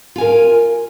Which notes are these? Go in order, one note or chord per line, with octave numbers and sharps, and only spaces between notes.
F4 A#4 G#5